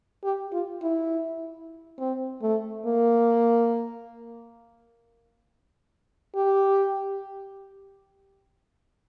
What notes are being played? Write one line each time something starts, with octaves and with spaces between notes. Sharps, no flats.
G4
F4
E4
C4
A3
A#3
G4